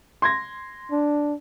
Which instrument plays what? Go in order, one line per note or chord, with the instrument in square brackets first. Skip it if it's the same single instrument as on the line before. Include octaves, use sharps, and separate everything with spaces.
[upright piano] C6 G#6 A#6
[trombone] D4